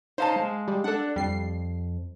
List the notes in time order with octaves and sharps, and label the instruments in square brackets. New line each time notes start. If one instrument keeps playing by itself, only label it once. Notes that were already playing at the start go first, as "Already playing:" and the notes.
[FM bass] D#4 [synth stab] C5 [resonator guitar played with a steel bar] C#5 F5 A5
[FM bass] G#3
[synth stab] G3
[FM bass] D4 [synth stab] A4 F#5
[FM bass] F2 [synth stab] G3 C7